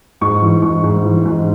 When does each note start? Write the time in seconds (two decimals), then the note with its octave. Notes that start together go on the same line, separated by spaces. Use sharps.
0.21 G#2 C#6
0.42 E3
0.62 G#2 C#6
0.83 G#2
1.04 E3
1.25 G#2